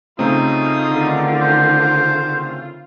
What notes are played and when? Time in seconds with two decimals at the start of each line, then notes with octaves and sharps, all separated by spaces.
0.19 C#3 A3 C4 D#4 F4 D#6
0.87 D3 D#3
1.41 C5